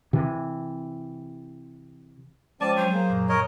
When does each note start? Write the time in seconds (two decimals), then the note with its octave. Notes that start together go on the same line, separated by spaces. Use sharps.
0.13 C3 E3
2.61 F3 G#3 C4 C#4 D5 A5
2.77 F#3 C5
2.93 A#3 G#4
3.10 F#2 A#2
3.29 A#4 C#5 D#5